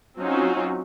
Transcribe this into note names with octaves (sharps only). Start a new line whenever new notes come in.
F#3 C4 C#4 D#4 F4 F#4